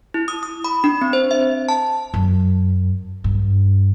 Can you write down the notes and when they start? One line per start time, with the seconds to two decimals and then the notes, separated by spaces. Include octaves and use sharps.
0.14 E4
0.28 D#6
0.43 D#6
0.64 B5
0.84 D4
1.02 C4
1.13 C5
1.31 E5
1.69 A5
2.14 F#2
3.24 G2